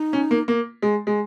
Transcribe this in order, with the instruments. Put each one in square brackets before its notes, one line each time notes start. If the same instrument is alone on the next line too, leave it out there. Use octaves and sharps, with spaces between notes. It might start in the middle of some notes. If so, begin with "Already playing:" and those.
Already playing: [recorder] D#4
[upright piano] C#4
A#3
A#3
G#3
G#3